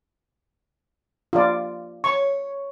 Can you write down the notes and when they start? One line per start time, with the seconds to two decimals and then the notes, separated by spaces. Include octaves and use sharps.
1.33 F4 D5
2.04 C#5 C#6